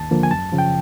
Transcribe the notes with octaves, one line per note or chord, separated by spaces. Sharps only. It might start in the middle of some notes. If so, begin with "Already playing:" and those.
Already playing: D#2 A5
D3 F3 A#3
G#5
F#2 A5
C#3 F3
G5